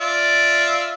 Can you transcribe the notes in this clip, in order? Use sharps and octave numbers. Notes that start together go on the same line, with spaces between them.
F4 D5 E5